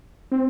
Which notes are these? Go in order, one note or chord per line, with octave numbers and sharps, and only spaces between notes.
C4